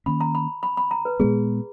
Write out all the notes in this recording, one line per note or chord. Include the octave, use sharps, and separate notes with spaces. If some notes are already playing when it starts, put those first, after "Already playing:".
D#3 A#3 C#4 B5
A#5
B5
B5
B5
A#5
B4
A#2 G#3 B3 G#4